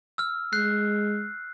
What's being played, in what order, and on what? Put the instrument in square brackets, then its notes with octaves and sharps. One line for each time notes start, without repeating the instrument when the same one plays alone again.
[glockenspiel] E6 F6
[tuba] G#3 [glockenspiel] F#6 G6 C7